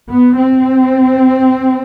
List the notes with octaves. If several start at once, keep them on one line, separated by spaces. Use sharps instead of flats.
B3
C4